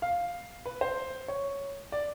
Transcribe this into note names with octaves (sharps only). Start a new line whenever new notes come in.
F5
B4
C5
C#5
D5